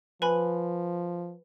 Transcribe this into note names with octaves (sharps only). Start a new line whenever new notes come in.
F3 B4 G#5 B5